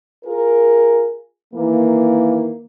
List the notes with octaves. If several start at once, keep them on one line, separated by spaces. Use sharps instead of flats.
F4 G#4 A#4
D#3 E3 A#3